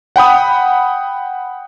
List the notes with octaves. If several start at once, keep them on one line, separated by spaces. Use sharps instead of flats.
F#5 G5 B5 D#6